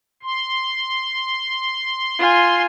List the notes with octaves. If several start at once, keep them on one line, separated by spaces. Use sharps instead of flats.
C6
F4 G#5